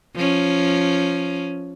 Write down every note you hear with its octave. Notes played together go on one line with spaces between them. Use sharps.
F3 C#4